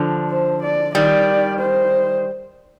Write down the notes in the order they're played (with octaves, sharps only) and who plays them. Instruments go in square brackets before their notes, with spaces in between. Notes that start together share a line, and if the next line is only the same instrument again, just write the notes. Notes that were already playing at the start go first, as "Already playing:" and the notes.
Already playing: [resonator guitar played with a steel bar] D3 F3
[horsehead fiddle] C5
D5
[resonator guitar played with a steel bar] D#3 G3 [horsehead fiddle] D5
[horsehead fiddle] C5